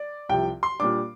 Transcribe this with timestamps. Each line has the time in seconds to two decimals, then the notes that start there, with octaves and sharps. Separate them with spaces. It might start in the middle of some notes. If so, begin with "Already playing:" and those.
Already playing: D5
0.29 C2 C3 F3 G5
0.63 C6
0.80 A#2 G3 D4 D6